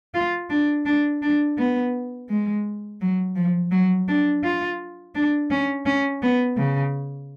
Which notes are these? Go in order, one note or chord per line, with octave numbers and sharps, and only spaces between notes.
F4
D4
D4
D4
B3
G#3
F#3
F3
F#3
D4
F4
D4
C#4
C#4
B3
C#3